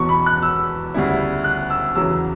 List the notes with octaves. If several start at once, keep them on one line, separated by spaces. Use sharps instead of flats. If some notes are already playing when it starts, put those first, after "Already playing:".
Already playing: E2 B2 F#3 C#6
B5
F#6
E6
D2 C#3 G3 B3 E4
F#6
E6
E2 C#3 F#3 E6